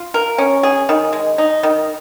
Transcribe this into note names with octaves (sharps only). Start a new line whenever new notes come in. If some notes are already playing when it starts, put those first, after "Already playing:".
Already playing: F4
A#4
C#4
G#4
D#3
G#3
D#4
D#3